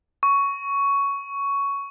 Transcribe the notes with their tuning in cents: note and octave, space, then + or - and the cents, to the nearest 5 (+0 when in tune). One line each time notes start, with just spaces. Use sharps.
C#6 +10